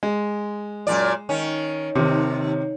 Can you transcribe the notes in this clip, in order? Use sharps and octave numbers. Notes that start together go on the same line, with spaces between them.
G#3
F#2 A#2 D5
D#3 C#4
D#2 C3 D#3